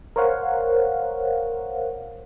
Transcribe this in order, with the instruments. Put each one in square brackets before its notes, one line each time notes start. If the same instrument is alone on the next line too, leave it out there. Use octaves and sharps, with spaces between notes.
[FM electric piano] A#4 C5 C#5 F5 F#5